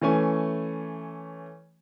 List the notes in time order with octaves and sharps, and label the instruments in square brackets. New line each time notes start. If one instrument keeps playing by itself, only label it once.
[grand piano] E3 A3 C#4 G#5 C#6